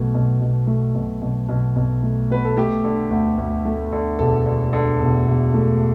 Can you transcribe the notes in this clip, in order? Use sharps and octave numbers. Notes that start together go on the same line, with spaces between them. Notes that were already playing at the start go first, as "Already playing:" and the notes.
Already playing: B1 B2 A3
B1
B1
A3
B1
B1
B1
B1
A3
B2 B4
A4
A3 G4
D3
D2
D2
A3
D3
E1 A4
D3
D3
E1
E1
A3